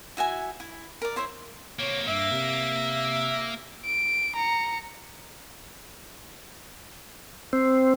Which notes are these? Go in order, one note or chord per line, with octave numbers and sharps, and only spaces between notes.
E4 F#4 E5 G#5
E4
A#4 D5
E4 C5 C#5 E5
C3 A#3 C#5
G2 A#3 E5
C3
D7
A#5 C#7
C4